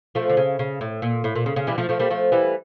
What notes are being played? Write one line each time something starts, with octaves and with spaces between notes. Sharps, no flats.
F3 A3
D3
C#3
C#3
A2
A#2
A2
A#2
C#3
C#3
E3 G3
F3 A3
F3 A3
G3 A#3
F3 A3
E3 G3